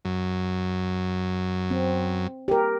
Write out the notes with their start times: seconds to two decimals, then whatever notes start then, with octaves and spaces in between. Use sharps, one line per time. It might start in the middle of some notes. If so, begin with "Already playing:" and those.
0.05 F#2
1.71 C4
2.48 G4 A#4